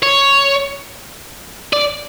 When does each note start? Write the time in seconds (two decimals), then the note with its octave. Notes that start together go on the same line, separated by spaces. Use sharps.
0.03 C#5
1.73 D5